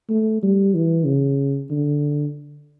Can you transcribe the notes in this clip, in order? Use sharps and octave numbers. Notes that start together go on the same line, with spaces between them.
A3
G3
E3
C#3
D3